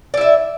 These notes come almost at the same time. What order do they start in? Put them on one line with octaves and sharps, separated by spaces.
D5 E4 E5